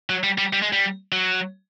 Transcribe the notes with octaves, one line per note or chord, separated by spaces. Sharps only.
F#3
G3
G3
G3
G#3
G3
F#3